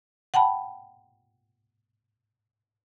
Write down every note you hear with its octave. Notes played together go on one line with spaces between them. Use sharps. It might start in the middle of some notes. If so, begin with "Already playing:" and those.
F#5 G5 A5 B5